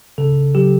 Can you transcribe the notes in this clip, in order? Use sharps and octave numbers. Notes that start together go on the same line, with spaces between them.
C#3 A4
F#3 G4